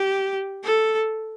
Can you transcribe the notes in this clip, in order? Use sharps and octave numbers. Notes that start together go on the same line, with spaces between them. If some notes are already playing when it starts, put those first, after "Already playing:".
Already playing: G4
A4